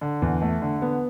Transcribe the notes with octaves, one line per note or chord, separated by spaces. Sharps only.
D3
E2
A3
D3
B3